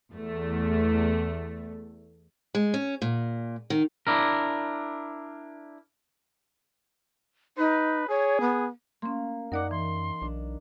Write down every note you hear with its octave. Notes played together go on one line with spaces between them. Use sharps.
E2 A3
G#3
C#4
A#2
D#3
D4 E4 A#4
D#4 B4
G#4 C#5
B3
A#3 C#4 C6
F#2 D#4 A#4 D5 F#5 D6
E3 C6
B1 D4